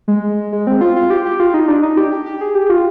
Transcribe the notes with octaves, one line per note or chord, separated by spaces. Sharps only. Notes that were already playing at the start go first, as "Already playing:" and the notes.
G#3
G#3
C4
F4
F4
G4
G4
F4
D#4
D4
D#4
G4
G4
G4
G#4
G4
F4